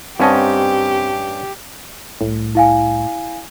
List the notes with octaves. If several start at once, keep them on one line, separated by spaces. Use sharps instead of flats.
G2 C4 C#4 G4 D#5 F#5 A5
C2 A2
E4 F5 G#5